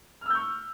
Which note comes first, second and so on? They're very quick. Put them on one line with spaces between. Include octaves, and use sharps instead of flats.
F6 E6 G6 C#6